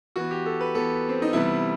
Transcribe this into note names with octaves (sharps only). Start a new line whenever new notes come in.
E3 B3 F#4
G4
A4
B4
E3 B3 A4
C4
D#4
C3 E3 G3 B3 E4